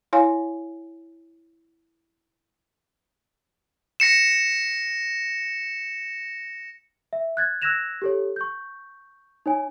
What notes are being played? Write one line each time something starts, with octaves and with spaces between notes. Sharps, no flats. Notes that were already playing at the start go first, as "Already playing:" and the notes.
E4 C#5 F5 G#5
A#6 C#7 E7
E5
F#6 G#6 A6
E6 F#6 G#6 A#6 E7 F7
G4 A4 C#5
C#6 G6
D#4 C#5 G#5